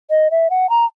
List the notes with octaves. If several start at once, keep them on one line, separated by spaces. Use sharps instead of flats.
D#5
E5
F#5
A#5